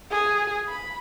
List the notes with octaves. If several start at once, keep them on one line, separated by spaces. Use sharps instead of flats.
G#4
B5